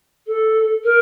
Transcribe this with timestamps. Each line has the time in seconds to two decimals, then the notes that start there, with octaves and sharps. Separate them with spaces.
0.27 A4
0.84 A#4